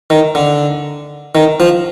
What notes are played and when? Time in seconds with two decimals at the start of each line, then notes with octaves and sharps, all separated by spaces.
0.10 D#3
0.35 D3
1.35 D#3
1.60 F3